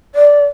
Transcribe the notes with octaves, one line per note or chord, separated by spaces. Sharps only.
D5